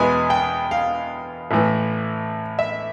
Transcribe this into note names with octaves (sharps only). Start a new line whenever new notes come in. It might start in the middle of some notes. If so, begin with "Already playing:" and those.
Already playing: E2 B2 G#3 B3 G#5
G5
F5
A1 A2 E3
E5